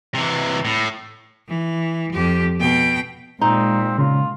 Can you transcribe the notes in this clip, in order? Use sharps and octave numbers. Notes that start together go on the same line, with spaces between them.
C3 E3
A2
E3
F2 G4
B2 G5
A#2 G#3 C4 D#4
C#3 F4